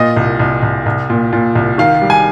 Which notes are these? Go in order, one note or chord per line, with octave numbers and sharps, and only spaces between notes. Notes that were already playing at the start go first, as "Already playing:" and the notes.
Already playing: A#2 D#5
C2
C2
C2
C2
A#2
A#2
C2
D#3 F5
G3
G#5